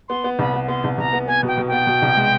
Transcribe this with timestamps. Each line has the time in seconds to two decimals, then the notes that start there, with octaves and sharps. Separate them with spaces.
0.09 B3 C6
0.24 B3
0.39 C2 B5
0.54 B3
0.68 B3 C6
0.84 C2
0.98 C2 A#5
1.13 B3
1.27 B3 G#5
1.43 B2 G5
1.58 B2
1.68 B3 G5
1.87 B2
2.02 C2
2.17 G#3